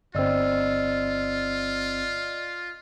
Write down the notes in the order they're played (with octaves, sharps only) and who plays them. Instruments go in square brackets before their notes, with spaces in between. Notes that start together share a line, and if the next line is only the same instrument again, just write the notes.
[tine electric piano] G1 C4 [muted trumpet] F4 [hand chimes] D5 D#5 E6